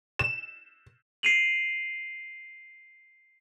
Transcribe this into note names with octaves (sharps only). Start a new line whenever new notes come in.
E7
C7 D7 D#7 F7 F#7